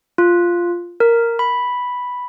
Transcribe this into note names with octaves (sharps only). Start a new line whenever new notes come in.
F4
A#4
B5